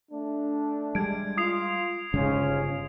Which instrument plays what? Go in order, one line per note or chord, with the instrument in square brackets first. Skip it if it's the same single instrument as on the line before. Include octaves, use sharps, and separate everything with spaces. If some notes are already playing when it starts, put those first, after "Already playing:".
[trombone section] A3 D4
[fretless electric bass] G3 G#3 [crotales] G#6 D7
[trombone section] F4 [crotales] D#6 C7 F7
[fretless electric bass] G1 C#3 G#3 [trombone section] G#2 C#4 F4